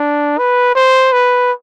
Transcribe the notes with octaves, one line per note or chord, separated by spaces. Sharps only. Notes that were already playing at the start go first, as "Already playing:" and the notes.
Already playing: D4
B4
C5
B4